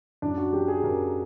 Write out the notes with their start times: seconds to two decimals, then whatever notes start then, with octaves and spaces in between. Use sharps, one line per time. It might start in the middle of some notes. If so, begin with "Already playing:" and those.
0.22 F#2 D4
0.37 F#4
0.53 F#3 G4
0.68 G#4
0.83 F#2 A#4